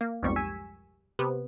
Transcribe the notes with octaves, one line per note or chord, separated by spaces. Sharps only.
A#3
B1 F2 G#2 G3 C#6
G#5 E6 B6
C3 B3